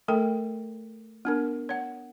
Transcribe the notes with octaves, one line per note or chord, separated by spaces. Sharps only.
A3 A4 A#4 G5
B3 D4 A#4
C#5 F#5